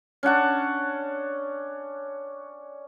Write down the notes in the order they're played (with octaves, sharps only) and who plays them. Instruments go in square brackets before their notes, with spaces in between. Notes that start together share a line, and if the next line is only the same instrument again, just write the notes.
[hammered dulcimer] C#4 D4 F#5 A5